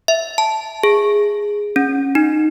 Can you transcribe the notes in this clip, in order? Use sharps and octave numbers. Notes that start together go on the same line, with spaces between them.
E5
A5
G#4
C#4
D#4